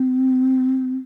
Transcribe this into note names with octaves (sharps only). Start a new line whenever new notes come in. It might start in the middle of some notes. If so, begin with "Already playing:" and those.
Already playing: C4